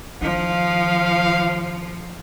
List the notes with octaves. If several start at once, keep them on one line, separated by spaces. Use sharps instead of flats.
D#3 F3 F5